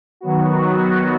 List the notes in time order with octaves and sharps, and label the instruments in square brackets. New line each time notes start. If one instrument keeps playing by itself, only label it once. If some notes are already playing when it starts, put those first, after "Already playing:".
[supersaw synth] D#3 F#3 B3 F#4